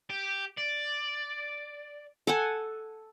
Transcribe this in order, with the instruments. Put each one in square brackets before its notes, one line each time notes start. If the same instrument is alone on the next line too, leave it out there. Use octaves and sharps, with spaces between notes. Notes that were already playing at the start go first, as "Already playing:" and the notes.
[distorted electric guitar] G4
D5
[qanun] A4 F#5 G#5